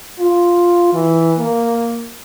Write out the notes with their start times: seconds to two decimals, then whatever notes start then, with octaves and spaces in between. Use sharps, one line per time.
0.19 F4
0.94 E3
1.39 A#3